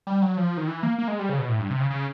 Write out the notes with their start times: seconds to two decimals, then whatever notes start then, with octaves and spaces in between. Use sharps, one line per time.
0.07 G3
0.22 F#3
0.37 F3
0.57 D#3
0.67 E3
0.83 A#3
0.99 A#3
1.08 G#3
1.19 G3
1.29 C#3
1.39 B2
1.49 A2
1.60 G2
1.70 C3
1.80 C#3
1.91 C#3